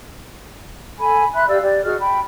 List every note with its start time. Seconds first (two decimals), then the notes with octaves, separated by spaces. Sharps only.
0.99 A4 G#5 B5
1.34 E5 B5 C6 F#6
1.49 G4 D5 F5 E6
1.62 G4 D5
1.84 F#4 G#4 D#5 F6
1.99 G5 B5